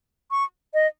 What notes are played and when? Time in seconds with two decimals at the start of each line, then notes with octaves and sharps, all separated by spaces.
0.31 C#6
0.74 D#5